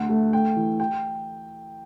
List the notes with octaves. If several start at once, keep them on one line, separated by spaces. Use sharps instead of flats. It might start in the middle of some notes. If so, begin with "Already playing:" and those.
Already playing: D2 F#5
A3
A3 G5
E3
G5